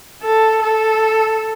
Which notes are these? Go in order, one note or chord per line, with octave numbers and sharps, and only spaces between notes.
A4
A4